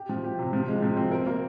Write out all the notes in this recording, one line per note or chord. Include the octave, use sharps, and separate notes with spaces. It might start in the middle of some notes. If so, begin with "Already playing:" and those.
Already playing: G4
F3
G4
C3
F3
G#3
F3
C4
A#4
A#3